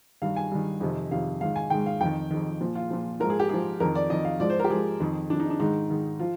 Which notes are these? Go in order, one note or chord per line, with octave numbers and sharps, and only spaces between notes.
G2 D#3 F5
G#5
G2 D#3
F2 C3 D#3
F2 C3 D#3 F5
G#2 D#3 F5
G#5
G#2 D#3 G5
F5
F2 D#3 G5
F2 D#3
A#2 F3
F4
A#2 F3
G#2 F3 A#4
G#4
G4
G#2 F3 G#4
F2 D#3 A#4
D5
F2 D#3 D#5
F5
G#2 F3 D5
C5
G4 A#4
G#2 F3 G#4
F2 D#3
F2 D#3 D4
D#4
D4
G#2 D#3 D#4
G#2 D#3
F3 F4